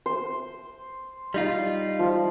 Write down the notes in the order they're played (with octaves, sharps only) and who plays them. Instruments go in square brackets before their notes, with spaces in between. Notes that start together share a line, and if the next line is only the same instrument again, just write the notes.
[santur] C5
[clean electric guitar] G3 D#4 F4
[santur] F3